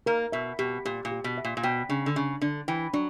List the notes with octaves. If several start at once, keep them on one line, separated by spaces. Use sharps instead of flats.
A#3 A#4
B2 E5
B2 G4
A#2 G4
A#2
G4
B2
E5
A#2
A#2
B2 G5
C#3 D4
D3
C#3 D4
D3 D4
E3 G5
F#3 D4